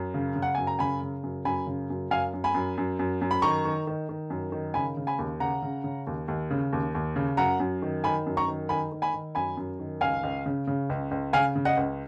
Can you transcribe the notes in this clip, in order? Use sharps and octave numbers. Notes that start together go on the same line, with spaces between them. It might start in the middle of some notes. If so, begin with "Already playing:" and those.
Already playing: F#2
C#3
C#3
F#5
F#2 G#5
A#5
C#3 G#5 B5
C#3
F#2
F#2 G#5 B5
C#3
F#2
F#2 F5 G#5
F#2
G#5 B5
F#2
F#2
F#2
F#2
B5
D#3 A#5 C#6
D#3
D#3
D#3
F#2
D#3
C#3 G#5 B5
C#3
G#5 B5
D#2
C#3 F#5 A#5
C#3
C#3
D#2
D#2
C#3
D#2
D#2
C#3
F#2 F#5 A#5
F#2
D#3
D#3 G#5 B5
F#2
A#5 C#6
D#3
D#3 G#5 B5
D#3
G#5 B5
D#3
F#2 G#5 B5
F#2
D#3
C#2 F5 G#5
C#2
C#3
C#3
C#2
C#2
C#3 F5 G#5
C#3
D#5 F#5
C#2